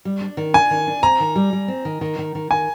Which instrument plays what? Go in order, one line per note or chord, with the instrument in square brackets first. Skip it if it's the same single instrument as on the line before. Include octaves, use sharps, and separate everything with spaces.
[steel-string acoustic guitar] G3
D4
D#3
[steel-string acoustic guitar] D4 [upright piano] G#5
[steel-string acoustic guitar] D#3
D4
[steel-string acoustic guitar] C4 [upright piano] A#5
[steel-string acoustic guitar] D#3
G3
G3
C4
D#3
D#3
D#3
D#3
[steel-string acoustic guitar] D#3 [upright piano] G#5